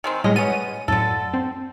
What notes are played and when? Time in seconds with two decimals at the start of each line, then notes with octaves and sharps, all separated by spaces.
0.04 D#3 G#3 C4
0.24 A2 G3 G#3 C#4 D#5
0.36 B3 C#4 D#7
0.88 F#2 A2 D3 A4
1.34 C4